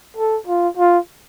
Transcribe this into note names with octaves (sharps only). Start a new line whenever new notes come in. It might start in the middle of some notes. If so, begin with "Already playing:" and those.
A4
F4
F4